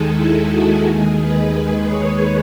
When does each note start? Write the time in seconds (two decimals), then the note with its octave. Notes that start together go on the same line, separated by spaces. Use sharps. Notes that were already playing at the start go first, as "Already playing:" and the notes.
Already playing: D#2 D#3 G#3 G#4 A4
0.12 E4
0.48 F#4
0.82 D#2 D#3 G#3 G#4
1.17 B4
1.86 C#5